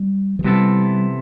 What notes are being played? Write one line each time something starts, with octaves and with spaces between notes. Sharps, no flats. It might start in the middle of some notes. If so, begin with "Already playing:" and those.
Already playing: G3
F3
C3 E3 G3 B3 E4 A4